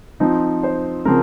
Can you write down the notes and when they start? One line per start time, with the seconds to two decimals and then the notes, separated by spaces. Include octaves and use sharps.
0.20 F3 C4 D#4
0.63 C5
1.05 C#3 F3 C4 A#4